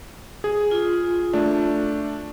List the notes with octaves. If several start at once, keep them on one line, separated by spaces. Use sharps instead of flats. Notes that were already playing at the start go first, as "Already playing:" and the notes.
G#4
F4
A3 D4